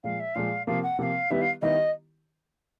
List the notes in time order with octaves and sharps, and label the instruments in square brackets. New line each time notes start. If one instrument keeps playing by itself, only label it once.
[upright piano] A#2 F3 G#3 [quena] F5
[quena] E5
[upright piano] A#2 F3 G#3 [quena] F5
[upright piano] C3 F3 A#3 [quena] F5
[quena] F#5
[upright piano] C3 F3 A#3 [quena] F5 F#5
[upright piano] D#3 G3 B3 E4 G4 [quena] E5
[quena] F5
[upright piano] D#3 G3 B3 E4 G4 [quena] D#5